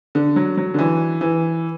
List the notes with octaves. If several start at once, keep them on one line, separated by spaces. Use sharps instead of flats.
D3
F#3
F#3
D3
E3
E3